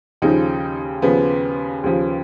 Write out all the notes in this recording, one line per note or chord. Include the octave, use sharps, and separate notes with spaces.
D#2 C#3 F3 D#4
D#2 C#3 F3 B3
D#2 C#3 F3